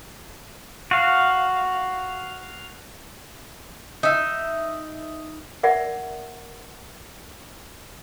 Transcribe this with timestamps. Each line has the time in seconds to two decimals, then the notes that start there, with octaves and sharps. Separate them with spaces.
0.91 F#4 F5
4.03 D#4 E5
5.63 A#4 D5 E5 F#5